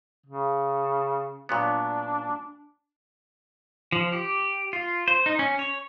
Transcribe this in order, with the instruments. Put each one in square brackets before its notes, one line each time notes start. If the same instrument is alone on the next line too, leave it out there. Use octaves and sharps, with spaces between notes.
[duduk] C#3
[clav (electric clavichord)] A#2 F#3 B3 [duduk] D4
[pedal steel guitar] F3
G4
F4
C5
D#4
C#4
C#5